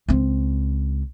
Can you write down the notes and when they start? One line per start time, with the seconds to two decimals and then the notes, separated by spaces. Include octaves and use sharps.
0.08 C#2 C4